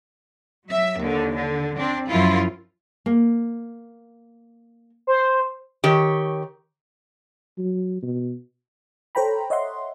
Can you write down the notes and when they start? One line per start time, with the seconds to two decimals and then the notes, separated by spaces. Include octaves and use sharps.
0.68 F#3 E5
0.99 D#2 D3
1.34 D3
1.77 C4 D4
2.07 F#2 F3 E4 F4
3.06 A#3
5.07 C5
5.84 D#3 G4 C#5
7.58 F#3
8.02 B2
9.15 A4 C5 C#5 G5 A#5 B5
9.50 C#5 D#5 E5 F#5 C6